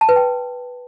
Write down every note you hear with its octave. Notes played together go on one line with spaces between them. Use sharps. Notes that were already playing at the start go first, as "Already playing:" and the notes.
A5
B4
G5